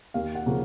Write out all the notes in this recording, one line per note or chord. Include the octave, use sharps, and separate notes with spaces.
D#2 F5
F#5
C#3 F3 A#3 C#4